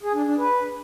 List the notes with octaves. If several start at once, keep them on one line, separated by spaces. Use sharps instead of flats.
G#4
D4
D4
B4